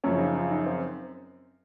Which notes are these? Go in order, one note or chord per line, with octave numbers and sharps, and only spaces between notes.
F#2 C#3 F3 C#4
D#4
F4
D#4
C4